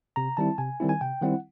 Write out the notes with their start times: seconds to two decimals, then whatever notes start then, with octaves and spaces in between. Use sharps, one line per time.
0.16 C3 A#5
0.37 D#3 G3 C4 E4 A5
0.58 C3 G#5
0.80 D#3 G3 C4 E4
0.89 G#5
1.01 C3 G5
1.22 D#3 G3 C4 E4 F#5